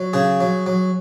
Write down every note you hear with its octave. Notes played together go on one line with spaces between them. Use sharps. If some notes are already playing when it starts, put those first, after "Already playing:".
Already playing: F#3
C#3 G#4
F#3
F#3